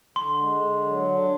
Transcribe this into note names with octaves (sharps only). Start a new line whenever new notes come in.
D3 C6
G#3
D3
F#3
D4